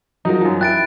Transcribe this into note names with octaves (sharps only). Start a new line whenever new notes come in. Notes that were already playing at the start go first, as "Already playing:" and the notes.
F3 F#3 D#4 A#4
F#2 F3
E4 G5 F#6 A6 D7